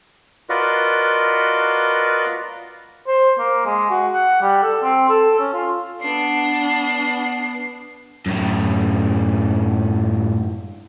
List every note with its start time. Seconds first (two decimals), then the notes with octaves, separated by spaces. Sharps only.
0.49 F4 F#4 A#4 B4 D5 D#5
3.07 C5
3.39 A#3
3.66 G#3
3.90 F#4
4.13 F#5
4.42 G3
4.62 A4
4.83 C4
5.09 A4
5.39 C#4
5.53 F4
6.01 B3 D4 C7
8.26 F#2 A2